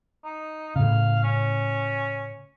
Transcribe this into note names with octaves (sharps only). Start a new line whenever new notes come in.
D#4
A2 C#3 F5
C#4